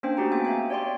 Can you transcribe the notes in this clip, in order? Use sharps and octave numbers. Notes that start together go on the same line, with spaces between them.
A#3 C#4 D4 C5 G5
A3 F#4 G4 A#5
A#3 B3 G4 G#4 G5 G#5
E5 F5 G#5
C#5 D5 G5 C6
D5